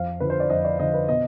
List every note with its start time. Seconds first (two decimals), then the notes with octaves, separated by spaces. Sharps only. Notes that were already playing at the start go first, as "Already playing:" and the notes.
Already playing: F2 F5
0.20 D3 F3 B4
0.30 C5
0.40 D5
0.50 F2 D#5
0.65 D5
0.79 D3 F3 D#5
0.94 B4
1.08 B2 D#5